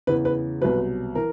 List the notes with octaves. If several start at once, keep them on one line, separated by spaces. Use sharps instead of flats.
E2 C#3 E3 B4
B4
C2 B2 F#3 B4
E3 A#4